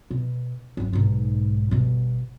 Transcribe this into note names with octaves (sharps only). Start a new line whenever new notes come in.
B2
F#1 G2
B1 G#2
G1 B2